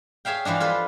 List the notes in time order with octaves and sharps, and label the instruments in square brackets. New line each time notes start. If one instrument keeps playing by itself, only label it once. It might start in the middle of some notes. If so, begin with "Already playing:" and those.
[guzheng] G#4 C#5 E5 F5 G5
E3 F3 G#3 D4
F4 A4 B4